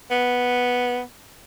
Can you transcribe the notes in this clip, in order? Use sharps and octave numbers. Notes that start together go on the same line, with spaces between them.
B3